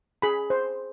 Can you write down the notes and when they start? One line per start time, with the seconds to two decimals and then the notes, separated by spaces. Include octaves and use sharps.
0.22 G#4 B5
0.50 C5